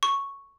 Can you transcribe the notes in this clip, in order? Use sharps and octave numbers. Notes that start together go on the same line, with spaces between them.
C#6